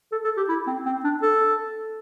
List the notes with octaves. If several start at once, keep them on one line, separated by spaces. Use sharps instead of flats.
A4
A4
G4
E4
C4
C4
D4
A4